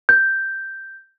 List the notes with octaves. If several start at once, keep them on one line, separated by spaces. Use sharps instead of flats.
G6